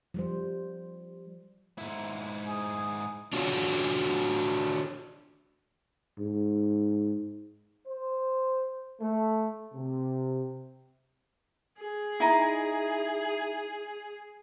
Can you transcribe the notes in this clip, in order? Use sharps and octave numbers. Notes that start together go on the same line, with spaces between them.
F3 G3 C5
G#2 E4
G#4
D4 F4 F#4 A4 C#5
G#2
C5
A3
C3
G#4
D#4 E4